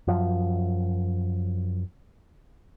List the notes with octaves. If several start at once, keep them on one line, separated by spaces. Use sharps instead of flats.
F#2 F3